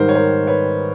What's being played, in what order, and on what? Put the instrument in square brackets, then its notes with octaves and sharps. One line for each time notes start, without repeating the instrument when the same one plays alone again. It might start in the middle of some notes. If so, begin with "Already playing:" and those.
Already playing: [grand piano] G#2 D#3 G3 A#4 C5
C#5
A#4 C5
B4 C#5